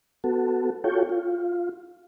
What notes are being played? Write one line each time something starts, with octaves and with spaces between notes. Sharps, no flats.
B3 F#4 A4
F4 F#4 A4 C#5 G5
F4